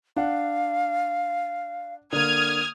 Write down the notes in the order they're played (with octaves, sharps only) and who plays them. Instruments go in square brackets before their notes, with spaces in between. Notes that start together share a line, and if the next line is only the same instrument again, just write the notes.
[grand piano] D4 F#5 [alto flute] F5
[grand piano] D3 A#3 [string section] D#6 F6 G#6